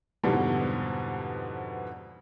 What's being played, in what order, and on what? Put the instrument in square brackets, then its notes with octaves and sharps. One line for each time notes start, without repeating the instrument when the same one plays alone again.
[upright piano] F2 G#2 B2 D3 E3 G3